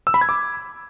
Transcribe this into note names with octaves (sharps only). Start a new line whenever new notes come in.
E6
B5
G#6
D6